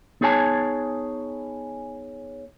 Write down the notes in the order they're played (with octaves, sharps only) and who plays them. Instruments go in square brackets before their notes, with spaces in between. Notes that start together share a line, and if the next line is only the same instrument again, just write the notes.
[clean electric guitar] B3 D#4 G#4 C#5 G#5 A5